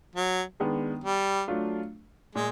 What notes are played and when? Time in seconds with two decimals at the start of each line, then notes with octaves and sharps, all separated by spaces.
0.16 F#3
0.60 D#3 G#3 B3 D4
1.04 G3
1.48 F#3 A3 D4 F4
2.35 A#2 G#3